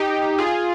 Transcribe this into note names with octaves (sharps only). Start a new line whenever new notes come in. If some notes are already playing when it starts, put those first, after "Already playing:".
Already playing: D#4 G4
F4 G#4